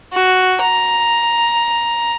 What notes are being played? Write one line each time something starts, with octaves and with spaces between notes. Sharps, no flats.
F#4
A#5